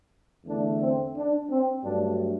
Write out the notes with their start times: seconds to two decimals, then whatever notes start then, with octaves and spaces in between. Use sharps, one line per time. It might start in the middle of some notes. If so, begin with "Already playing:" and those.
0.45 E2 D3 A3 D4
0.80 C4
1.15 D4
1.49 C4
1.83 G2 F#3 A3 D4